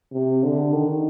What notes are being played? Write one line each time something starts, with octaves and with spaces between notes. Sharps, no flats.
C3
D3
D#3